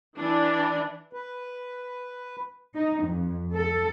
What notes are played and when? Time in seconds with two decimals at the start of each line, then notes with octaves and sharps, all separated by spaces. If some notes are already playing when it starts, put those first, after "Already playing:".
0.18 E3 D4
1.13 B4
2.75 D#4
3.05 F2
3.55 A4